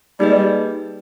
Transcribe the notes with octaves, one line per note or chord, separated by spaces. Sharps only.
G3 A#3 D#4 G#4 B4 D#5